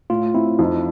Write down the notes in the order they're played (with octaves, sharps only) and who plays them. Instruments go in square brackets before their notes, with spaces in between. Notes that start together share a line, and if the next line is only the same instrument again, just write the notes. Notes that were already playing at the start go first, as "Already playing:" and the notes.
[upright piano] A2 [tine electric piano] F4
[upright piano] C4 [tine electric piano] E4
[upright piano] F2 [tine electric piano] D#4